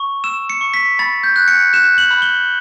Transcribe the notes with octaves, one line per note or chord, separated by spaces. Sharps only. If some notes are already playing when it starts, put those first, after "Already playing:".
Already playing: C#6
E6 E7
C#7
C#6
B6
B5 A6
G6
F#6
C#7
F#6 E7
F#7
B5
G7